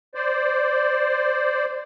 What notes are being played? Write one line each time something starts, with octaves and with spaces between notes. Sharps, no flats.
C5 D5